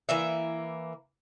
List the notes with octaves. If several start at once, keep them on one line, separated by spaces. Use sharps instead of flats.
E3 A#3 E5